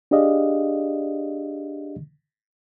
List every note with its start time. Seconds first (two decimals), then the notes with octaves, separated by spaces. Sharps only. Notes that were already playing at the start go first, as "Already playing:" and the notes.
0.11 D4 G4 G#4 D5 D#5 F5